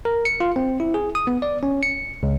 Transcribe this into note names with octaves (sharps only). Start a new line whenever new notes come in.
A#4
C#7
F4
C4
E4
G#4
D#6
B3
D5
C#4
C#7
C#2